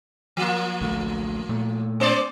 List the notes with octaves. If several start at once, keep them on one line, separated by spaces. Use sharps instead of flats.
F3 A#3
A1 D2 A3
A#2 A3
B3 C5 D5